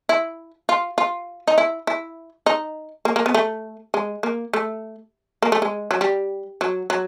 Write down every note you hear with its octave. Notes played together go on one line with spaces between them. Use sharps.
E4
F4
F4
D#4
E4
E4
D#4
A#3
A#3
B3
A3
G#3
A#3
A3
A#3
A3
G#3
F#3
G3
F#3
F#3